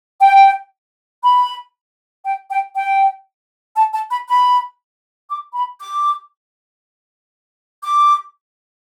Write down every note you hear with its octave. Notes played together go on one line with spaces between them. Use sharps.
G5
B5
G5
G5
G5
A5
A5
B5
B5
D6
B5
D6
D6